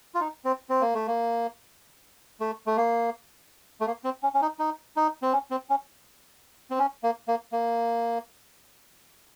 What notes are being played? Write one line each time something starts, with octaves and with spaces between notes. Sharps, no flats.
F4
D#4
C4
C4
A#3
A3
A#3
A3
A3
A#3
A3
A#3
C4
C#4
C#4
D#4
D#4
D#4
C4
C#4
C4
C#4
C4
C#4
A#3
A#3
A#3